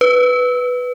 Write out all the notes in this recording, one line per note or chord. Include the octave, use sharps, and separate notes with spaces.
B4